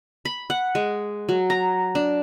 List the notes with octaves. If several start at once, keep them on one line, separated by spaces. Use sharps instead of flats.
B5
F#5
G#3
F#3
A#5
D4